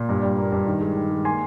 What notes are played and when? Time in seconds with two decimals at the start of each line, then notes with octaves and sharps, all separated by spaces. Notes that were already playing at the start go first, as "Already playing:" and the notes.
Already playing: A#2
0.09 G2
0.23 G3
0.38 A#3
0.52 G2
0.66 D#3
0.81 G#3
0.97 D#3
1.10 G#3
1.25 A#3 G#5 C6